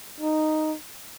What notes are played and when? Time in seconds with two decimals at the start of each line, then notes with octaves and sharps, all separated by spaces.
0.20 D#4